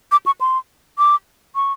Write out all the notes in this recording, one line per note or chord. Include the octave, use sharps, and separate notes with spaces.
D6
C#6
C6
D6
C#6